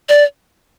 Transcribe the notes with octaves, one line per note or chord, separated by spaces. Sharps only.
D5